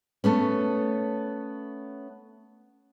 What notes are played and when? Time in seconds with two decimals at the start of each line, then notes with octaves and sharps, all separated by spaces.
0.24 A3 B3 C#4